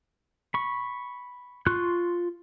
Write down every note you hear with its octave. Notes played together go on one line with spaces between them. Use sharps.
B5 C#6
F4 C6 C#6 F#6